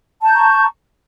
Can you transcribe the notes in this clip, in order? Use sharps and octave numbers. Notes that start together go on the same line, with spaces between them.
A5 A#5 C#6 G6